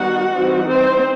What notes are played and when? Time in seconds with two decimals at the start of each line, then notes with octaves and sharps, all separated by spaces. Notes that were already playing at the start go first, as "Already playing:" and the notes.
Already playing: D#3 G3 B3 D#4 F#4 F#5
0.33 E3 G3 C4 D#4
0.70 C4 C5